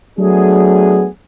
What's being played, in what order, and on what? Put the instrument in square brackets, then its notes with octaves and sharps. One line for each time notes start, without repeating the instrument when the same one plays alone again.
[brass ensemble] F#3 A3 B3 D4 G#4